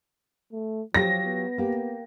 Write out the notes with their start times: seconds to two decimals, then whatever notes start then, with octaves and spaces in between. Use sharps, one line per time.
0.52 A3
0.94 F3 F#3 F4 G4 A#6
1.25 B3
1.58 A#3 G4